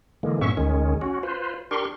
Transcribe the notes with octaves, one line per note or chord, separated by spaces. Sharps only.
D3 E3 G#3 A#3
G2 A#2 B3 C#4 E5 C#6
D2 D#3 G#3 C#4
C#4 F#4
F4 B4 C5
D4 G4 A#4 C6 C#6